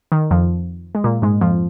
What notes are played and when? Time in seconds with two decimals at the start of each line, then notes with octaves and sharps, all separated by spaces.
0.12 D#3
0.31 F2 F3
0.95 G#3
1.04 A#2 A#3
1.22 G#2 G#3
1.41 F2 F3